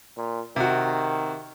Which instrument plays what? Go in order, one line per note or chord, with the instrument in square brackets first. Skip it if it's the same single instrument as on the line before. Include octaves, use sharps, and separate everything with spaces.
[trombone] A#2
[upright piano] C3 F#4 [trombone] D#3